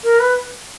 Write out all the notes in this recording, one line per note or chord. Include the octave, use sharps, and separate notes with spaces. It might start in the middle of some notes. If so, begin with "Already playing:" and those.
A#4
B4